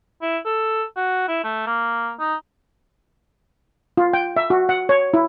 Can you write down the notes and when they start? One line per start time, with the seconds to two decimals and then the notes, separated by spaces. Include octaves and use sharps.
0.22 E4
0.45 A4
0.97 F#4
1.28 E4
1.44 A3
1.67 A#3
2.20 D#4
3.97 F4
4.13 G5
4.36 E5
4.50 F#4
4.69 F#5
4.89 C#5
5.14 E4